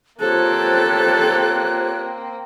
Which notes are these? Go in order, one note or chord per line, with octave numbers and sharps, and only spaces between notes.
A#3 C4 F4 G4 A4 C5 C#5 F#6